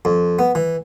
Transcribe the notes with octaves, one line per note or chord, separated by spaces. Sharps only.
F2
B3
E3